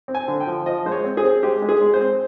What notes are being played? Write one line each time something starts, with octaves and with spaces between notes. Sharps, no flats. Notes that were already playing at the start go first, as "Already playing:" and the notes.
C4
G#5
D3
G5
F3
F3 D#5
G#3 C5
C#5
C4
G#4
C4
G#3 G4
G#3
G#4
G#3
C5
C4